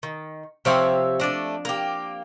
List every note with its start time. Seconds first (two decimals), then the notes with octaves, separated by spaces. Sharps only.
0.03 D#3
0.65 C3 F3 C4 G4 C#5 E5
1.20 A3 D4 D5 D#5
1.65 A#3 G4